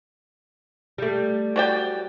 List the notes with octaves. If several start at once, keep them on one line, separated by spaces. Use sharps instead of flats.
G3 A3
F#3 D5 G5